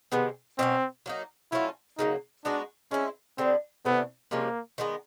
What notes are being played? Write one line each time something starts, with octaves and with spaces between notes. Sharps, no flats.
C3 D#3 G#3 B3
B2 F#3 A#3 C4 C#4
F#3 A#3 D#4
F#3 A3 C#4 E4 F4
C#3 F#3 A#3 D#4
G#3 B3 D4 D#4 F#4
G#3 C4 C#4 E4
D3 G3 B3 C4
C3 E3 A3 B3 D4
C3 F3 G#3 A#3 C#4
D#3 G#3 B3